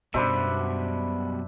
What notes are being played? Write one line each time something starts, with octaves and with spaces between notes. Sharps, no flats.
F#2 B2 G3 D4 C5 E5 B5